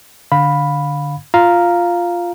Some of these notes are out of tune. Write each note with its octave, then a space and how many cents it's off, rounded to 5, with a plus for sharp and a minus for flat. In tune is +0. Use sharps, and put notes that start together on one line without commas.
D3 +0 F5 +20 B5 +0
F4 +0 F5 +0 A#5 +0